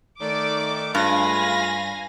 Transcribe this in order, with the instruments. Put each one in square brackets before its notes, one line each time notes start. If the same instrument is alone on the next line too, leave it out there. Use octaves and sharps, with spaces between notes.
[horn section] D#3 A3 [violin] D5 [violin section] D6
[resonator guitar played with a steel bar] G2 [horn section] G#3 A3 F4 [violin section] F5 G#5 [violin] B5 A#6